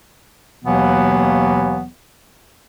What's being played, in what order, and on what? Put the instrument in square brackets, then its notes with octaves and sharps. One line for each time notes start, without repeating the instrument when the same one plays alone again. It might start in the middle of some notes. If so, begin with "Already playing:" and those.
[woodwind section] D#2 B2 E3 F#3 A#3 B3